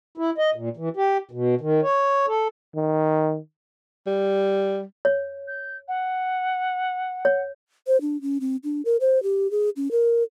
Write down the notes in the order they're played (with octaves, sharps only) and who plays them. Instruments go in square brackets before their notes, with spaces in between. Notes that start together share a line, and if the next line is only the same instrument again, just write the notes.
[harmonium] E4
D#5
A#2
E3
G4
B2
D#3
C#5
A4
[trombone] D#3
[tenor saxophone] G3
[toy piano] C#5
[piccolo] G6
F#5
[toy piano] C#5
[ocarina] C5
D4
C#4
C4
D4
A#4
C5
G4
G#4
C#4
A#4